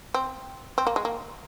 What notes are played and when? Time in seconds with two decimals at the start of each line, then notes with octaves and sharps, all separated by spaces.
0.14 C4
0.78 C4
0.87 A#3
0.96 G#3
1.05 A#3